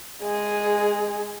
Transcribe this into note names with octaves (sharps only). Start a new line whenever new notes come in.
G#3 G#4